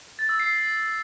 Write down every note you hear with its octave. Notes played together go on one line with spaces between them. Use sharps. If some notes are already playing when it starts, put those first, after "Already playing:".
A6
E6
C7